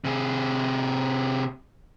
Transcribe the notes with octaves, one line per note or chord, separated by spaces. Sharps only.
C3 G#4